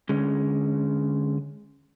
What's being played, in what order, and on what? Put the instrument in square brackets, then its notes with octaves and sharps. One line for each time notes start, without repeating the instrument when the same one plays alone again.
[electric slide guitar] D3 G#3 C#4